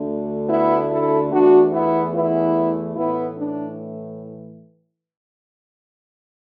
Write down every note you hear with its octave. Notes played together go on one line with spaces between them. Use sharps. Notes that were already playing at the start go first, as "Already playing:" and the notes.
Already playing: D2 D3 A3
B3 E4
E4 A4
E2 E3 A3 D4 F#4
B3 E4
B3 E4
A2 E3 A3 B3 E4
D4